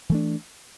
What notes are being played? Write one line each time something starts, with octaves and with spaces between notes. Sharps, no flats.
E3 A3 D4